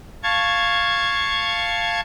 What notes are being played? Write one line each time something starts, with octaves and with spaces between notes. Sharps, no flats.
F5 A5 C#6 G#6